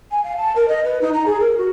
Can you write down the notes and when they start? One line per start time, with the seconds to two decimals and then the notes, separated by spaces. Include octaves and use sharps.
0.11 G#5
0.24 F5
0.37 A5
0.56 A#4
0.68 D#5
0.84 B4
1.01 D#4
1.14 A#5
1.26 G#4
1.40 A#4
1.58 F#4